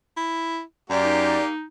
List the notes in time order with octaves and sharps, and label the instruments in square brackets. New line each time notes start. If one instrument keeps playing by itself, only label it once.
[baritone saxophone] E4
[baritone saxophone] F#2 [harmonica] A#3 G4 [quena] D5
[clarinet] D#4